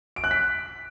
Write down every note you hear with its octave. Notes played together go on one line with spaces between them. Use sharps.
D7
F#6
B6